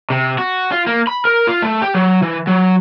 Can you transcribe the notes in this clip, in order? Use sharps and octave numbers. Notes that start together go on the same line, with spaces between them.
C3
F#4
F4
A#3
B5
A#4
F4
A3
G4
F#3
E3
F#3